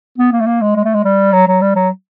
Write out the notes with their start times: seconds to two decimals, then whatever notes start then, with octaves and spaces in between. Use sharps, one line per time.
0.18 B3
0.32 A#3
0.40 A3
0.47 A#3
0.61 G#3
0.76 G#3
0.84 A3
0.94 G#3
1.04 G3
1.32 F#3
1.47 F#3
1.61 G3
1.75 F#3